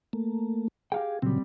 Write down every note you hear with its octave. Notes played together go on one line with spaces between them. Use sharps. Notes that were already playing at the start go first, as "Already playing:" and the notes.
A3 A#3
G4 G#4 F5 G5
A#2 C#3 F#3 G3 C4